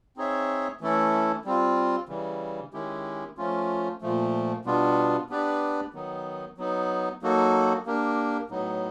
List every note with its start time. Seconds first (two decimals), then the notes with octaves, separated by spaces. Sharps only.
0.17 C4 D#4 G#4 C#5 E5
0.81 E3 A3 C#4 E4 A4
1.45 G3 C4 F4
2.09 C#3 E3 G3
2.73 D#3 G#3 C#4 E4 G4
3.37 F3 A3 C#4 F4
4.01 A#2 F3 A3
4.65 B2 G3 B3 D4 F4
5.29 B3 D4 G4 B4 D5
5.94 D#3 F#3 B3 D#4
6.57 F#3 B3 D#4
7.22 F#3 A#3 D#4 F#4 A4
7.86 A#3 D4 G4 A#4
8.50 A2 F#3 B3 D#4